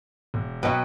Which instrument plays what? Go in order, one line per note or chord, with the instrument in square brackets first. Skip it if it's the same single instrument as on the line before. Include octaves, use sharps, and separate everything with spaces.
[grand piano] E1
[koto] B2 F#3 [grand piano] B4 D#5 G5